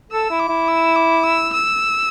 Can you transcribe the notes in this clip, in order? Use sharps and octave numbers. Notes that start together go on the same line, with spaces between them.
A4 E6
E4
D6
E4
E6
D6
E6
E6